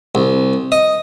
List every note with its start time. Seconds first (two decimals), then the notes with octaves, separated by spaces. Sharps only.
0.15 C2
0.72 D#5